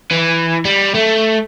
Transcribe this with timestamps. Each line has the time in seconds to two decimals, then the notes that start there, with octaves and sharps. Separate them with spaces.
0.11 E3
0.65 G3
0.95 A3